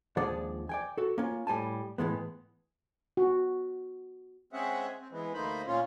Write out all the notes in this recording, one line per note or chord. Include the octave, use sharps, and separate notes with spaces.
D#2 F3 G#3 D4 D5 F#5
D5 G5 G#5
F#4 A4
A#3 C#4 F4
A2 G3 G#5 A5
A2 E3 G#3 B3
F#4
G#3 C4 C#4 G#4 E5 F#5
C4
E3 G#3 B3
D2 A3 A#3 D#4 C5 B5
A#2 C#4 F4